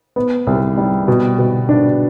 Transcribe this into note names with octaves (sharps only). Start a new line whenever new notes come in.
B3
C2
G3
B2
B2
D4